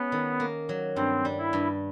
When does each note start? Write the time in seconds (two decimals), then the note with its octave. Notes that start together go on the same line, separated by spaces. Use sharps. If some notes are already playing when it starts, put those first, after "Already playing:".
Already playing: G#3 B3 C#4
0.12 D#3
0.40 A#3
0.69 F#3
0.96 G2 C4
1.25 G3
1.38 E4
1.53 G2